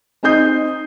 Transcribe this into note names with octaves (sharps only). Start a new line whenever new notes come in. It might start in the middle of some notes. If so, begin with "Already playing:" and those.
C4 D#4 D#5 D#6 G6 C7